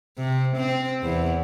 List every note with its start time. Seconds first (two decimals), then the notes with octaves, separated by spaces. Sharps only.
0.18 C3
0.56 C4
1.03 E2